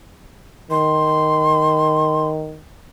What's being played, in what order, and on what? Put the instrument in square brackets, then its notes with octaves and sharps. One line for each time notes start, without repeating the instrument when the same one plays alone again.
[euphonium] D#3 [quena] C6